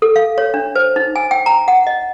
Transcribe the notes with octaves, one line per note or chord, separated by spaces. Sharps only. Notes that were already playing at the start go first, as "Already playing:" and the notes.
A4
F5
C#5
D4
C5
D#4
G#5
G5
A#5
F#5
D#5